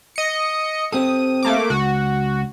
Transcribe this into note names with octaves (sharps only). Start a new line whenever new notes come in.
D#5 C#7
C4 G4 A4 D#6
A3 A#3 D6
C#2 F#4